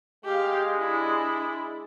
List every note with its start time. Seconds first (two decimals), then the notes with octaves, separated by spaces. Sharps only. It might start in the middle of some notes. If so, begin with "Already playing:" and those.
0.25 G#3 G4 F5
0.74 D4 E4